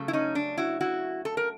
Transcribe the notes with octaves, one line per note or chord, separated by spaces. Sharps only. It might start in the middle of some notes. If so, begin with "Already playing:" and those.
Already playing: C#3 F#3 A3
E4
C#4 D#4
D4
E4 F#4
E4 F#4
A4
A#4